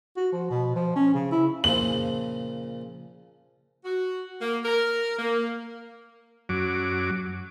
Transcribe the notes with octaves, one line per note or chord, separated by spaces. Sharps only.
F#4
F3
B2
F3
C#4
C#3
E4
A#2 C#3 F3 F#7
F#4
A#3
A#4
A#3
F#2 F#3 D6